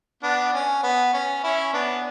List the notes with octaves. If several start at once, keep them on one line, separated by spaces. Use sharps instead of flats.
B3 D4
C#4
B3
C#4
C#4 E4
B3 D4